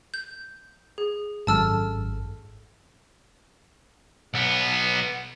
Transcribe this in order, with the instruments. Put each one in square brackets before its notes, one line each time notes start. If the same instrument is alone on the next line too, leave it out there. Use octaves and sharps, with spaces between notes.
[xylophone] G6
G#4
[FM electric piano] G#1 F#2 A4 [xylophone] A5 E6 F6
[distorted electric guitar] B1 B3